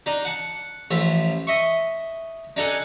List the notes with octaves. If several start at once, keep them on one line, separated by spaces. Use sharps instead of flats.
D4 D#4
F#5 A5
A1 F3 F4 E5
D#5 E5 C#6
D4 D#4 A4 F#5 G#5